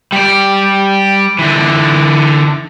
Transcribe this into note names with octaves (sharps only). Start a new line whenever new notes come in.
G3 D5
D3 E3